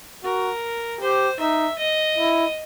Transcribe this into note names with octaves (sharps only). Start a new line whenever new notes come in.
F#4 A#4
G4 C5
D#4 E5
D#5
E4